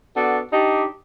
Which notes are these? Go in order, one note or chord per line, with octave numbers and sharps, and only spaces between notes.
B3 D4 F#4 A4
D4 D#4 G4